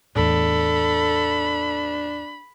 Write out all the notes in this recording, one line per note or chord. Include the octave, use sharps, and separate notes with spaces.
E2 A2 D4 A4 B5